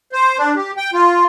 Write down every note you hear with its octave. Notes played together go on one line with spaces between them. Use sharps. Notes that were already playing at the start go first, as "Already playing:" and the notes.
C5
D4
G4
G5
F4